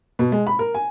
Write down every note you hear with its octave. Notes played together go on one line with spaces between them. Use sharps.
B2
G#3
B5
A#4
G#5